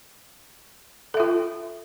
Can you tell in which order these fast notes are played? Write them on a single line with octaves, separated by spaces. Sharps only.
A4 E5 F4